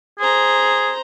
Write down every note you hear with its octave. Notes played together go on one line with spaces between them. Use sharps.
G#4 C5 A#5